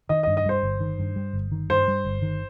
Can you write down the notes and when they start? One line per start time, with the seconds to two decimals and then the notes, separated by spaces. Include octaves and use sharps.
0.09 D#3 D#5
0.23 G2 D#5
0.37 D#5
0.46 G3 C5
0.63 G1
0.80 D#3
0.99 G2
1.16 G3
1.33 G1
1.52 D#3
1.69 G2 C5
1.88 G3
2.05 G1
2.22 D#3